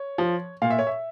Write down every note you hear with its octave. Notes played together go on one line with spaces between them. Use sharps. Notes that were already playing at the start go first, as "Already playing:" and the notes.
Already playing: C#5
F3
A#2 F5
E5
C#5
E5